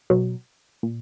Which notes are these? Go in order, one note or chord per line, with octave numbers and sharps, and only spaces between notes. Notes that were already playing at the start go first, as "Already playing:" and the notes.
B2 F#3
A#2